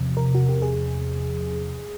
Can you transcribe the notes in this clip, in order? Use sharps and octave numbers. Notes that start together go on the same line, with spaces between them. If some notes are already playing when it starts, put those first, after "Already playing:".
Already playing: E2 C3 F3
A#4
F#4
G4
G#4